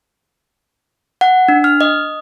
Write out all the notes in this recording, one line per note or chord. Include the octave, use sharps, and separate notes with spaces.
F#5
D4
F6
D#5